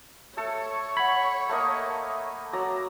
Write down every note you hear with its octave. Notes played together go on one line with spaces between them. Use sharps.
A3 A4 C#5
F#5 B5 G#6
A3 A#3 D#5
F#3 D5 A#5